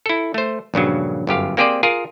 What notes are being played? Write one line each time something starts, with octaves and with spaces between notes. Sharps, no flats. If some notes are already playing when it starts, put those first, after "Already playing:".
E4 A4
A3 C5
A#1 G2 C#3 F#3
G1 F#2 G4 F5
A#3 C4 G4 G#4 C5 D5
F4 G#4 A#4